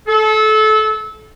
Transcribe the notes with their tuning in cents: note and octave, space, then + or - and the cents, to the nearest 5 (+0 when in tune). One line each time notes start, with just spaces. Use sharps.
A4 -25